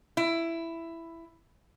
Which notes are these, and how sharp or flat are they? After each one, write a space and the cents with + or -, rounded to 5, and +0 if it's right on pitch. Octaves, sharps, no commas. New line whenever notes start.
E4 +10